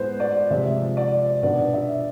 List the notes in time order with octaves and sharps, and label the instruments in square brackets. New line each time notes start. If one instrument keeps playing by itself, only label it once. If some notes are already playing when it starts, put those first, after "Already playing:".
Already playing: [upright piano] A2 G#3 B3 B4 C5
D5
C3 F3 G#3 E5
D5
B2 B3 D4 D5
E5